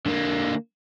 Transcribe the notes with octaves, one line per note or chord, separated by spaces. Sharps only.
D3 A#3